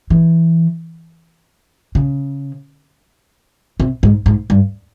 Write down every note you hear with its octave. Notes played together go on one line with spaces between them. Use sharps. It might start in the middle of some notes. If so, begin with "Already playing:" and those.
E3
C#3
C3
G#2
G#2
G2